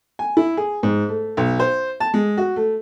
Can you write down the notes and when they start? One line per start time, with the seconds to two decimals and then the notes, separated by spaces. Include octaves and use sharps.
0.19 G#5
0.37 E4
0.57 G#4
0.83 G#2
1.09 A3
1.37 B1
1.60 C5
2.00 A5
2.14 G#3
2.38 F#4
2.56 A3